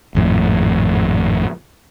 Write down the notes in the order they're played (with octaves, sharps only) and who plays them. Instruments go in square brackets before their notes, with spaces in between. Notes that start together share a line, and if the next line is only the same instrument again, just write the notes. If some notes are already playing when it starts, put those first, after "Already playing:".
[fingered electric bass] G#1 F2 A2